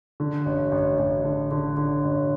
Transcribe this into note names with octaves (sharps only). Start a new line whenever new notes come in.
D3
A1
A1
A1
D3
D3
D3
A1